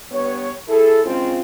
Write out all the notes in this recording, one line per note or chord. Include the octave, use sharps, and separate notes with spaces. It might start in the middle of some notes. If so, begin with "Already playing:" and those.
G2 B3 C#5
E4 G#4 A4
C#3 G#3 C4 F4